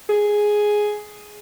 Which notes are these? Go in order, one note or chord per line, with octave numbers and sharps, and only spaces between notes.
G#4